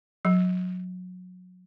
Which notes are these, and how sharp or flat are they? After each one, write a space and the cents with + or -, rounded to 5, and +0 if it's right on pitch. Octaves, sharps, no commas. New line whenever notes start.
F#3 -25